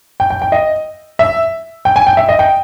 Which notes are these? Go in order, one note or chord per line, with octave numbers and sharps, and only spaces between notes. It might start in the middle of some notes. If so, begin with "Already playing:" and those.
G5
G5
G5
D#5
E5
G5
G#5
G5
E5
D#5
G5